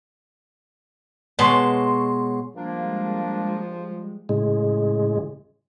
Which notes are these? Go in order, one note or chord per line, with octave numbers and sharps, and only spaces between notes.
B2 G#3 C#5 A5 C6 C#6
F3 G3 G#3 A#3 D4
A2 C#3 G#3